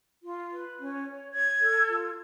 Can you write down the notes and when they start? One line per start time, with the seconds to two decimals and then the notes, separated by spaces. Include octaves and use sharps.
0.23 F4
0.50 B4
0.78 C#4
1.05 C#5
1.33 C#5 G#6
1.60 A4
1.88 F4